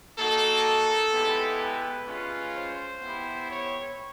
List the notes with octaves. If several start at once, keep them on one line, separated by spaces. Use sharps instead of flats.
A#3 D#4 F#4 A4
G#3 B3 E4 G4
B4
G#3 C#4 F4
C5
B3 E4 G4
C#5